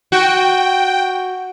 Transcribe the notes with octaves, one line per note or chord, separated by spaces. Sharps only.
F#4 G5